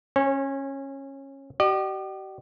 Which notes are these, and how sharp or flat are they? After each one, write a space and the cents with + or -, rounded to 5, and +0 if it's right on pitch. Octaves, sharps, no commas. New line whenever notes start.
C#4 -20 C#5 -45
G4 -40 D5 +45